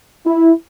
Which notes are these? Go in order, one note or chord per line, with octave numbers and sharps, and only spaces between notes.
E4